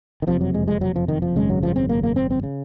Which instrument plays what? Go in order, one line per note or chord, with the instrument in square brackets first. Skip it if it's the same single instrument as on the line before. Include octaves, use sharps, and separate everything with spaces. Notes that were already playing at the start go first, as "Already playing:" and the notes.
[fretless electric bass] D#3
F#1 F2 C3 F3
F#3
G#3
G#3
F#3
F3
D#3
F3
G#1 F#2 C#3 G#3
F#3
F3
C4
A#3
A#3
C4
C4
C#3